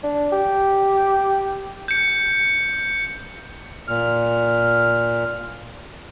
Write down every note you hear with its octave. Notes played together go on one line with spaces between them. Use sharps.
D4
G4
G6 C#7
A#2 F6